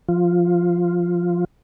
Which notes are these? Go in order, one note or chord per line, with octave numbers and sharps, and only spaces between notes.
F3 F4